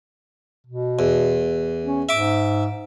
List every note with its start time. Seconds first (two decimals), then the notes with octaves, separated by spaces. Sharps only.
0.66 B2
0.99 E2
1.85 C#4
2.09 G#2 E5 D6